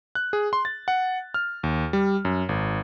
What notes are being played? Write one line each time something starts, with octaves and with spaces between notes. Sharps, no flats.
F#6
G#4
C6
A6
F#5
F6
D#2
G3
F#2
G#1